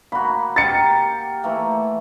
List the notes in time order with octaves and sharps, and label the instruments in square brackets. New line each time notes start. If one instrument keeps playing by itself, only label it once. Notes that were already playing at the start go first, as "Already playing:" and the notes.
[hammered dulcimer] A#3 F#4 [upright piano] B5
[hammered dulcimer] G4 A#4 [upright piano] A6 C#7
[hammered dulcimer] E3 A3 A#3